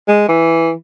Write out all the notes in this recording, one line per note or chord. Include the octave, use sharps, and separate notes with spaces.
G#3
E3